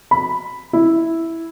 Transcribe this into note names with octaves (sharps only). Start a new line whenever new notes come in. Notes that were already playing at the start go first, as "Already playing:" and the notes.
B5
E4